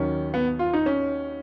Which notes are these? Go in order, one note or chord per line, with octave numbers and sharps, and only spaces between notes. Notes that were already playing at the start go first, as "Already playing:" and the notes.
Already playing: D#2 D#3 F#3 C#4
B3
F4
D#4
C#4